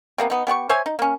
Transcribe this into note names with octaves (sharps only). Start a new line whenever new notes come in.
C3 A#3 B3
B3 D#4
B3 G4 F#5 C#6
C5 C#5 E5 G#5
D#4
A#3 C#4